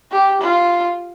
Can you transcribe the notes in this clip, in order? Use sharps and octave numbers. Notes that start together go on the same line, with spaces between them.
G4
F4